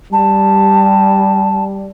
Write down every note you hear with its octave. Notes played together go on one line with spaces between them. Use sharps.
G3 A5